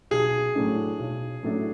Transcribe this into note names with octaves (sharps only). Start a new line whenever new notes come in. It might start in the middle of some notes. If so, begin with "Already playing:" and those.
B1 G#4
A2 F#3 A3 D4
B1
A2 F#3 A3 D4